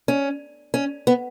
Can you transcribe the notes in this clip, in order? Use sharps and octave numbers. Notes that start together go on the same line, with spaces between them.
C#4
C#4
B3